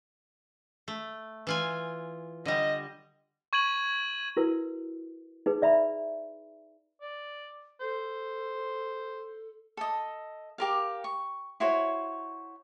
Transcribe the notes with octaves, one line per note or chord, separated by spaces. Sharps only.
A3
E3 F4 G#5
D3 G3 D#5
C#6 G#6 D#7 F#7
E4 F#4 A#4 B4
D#4 G#4 B4
D5 E5 A#5 B5
D5
A4 C5
A4 D#5
G4 A#4 F5
C#6
E4 F#4 C5 C#5